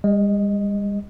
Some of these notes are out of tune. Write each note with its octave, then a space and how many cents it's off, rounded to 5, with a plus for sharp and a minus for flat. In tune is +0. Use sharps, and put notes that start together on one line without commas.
G3 +45 D#5 +0